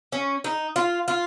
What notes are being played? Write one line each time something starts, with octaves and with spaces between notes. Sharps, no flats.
C#4
D#4
F4
F4